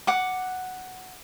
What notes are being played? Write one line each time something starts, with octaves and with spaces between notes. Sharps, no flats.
F#5 D6